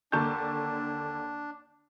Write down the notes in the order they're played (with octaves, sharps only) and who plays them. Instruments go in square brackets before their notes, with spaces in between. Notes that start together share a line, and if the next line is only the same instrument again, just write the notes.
[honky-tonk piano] D#2 D3 A#3 [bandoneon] D4 [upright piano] A5 C#6 G6